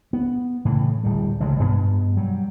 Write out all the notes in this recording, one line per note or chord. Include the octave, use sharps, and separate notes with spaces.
B3
A2 C#3 E3
D1 G3
A1 C#3 G#3
G2 B2 B3
F#3 G3